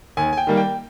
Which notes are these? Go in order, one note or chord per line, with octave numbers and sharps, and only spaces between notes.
D#2 G#5
G#5
G5
D#3 G3 A#3
G5